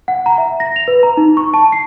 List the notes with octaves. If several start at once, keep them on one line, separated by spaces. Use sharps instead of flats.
F#5
A#5
E5
A#6
F7
B4
A#5
D#4
C#6
A5
C7